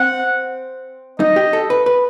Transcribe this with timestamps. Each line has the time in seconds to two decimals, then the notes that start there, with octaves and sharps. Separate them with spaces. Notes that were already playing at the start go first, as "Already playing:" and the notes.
Already playing: C4 F#5
1.20 D#4 D#5
1.36 G4
1.53 A4
1.70 B4
1.86 B4